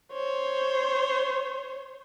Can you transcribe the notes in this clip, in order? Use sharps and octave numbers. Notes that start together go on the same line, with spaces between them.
C5 C#5